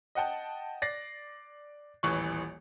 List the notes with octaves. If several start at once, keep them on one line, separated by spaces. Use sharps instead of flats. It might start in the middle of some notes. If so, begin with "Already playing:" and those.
D#5 F#5 G5 A5
D5 A6 A#6 C7
D#1 A1 E3 C#6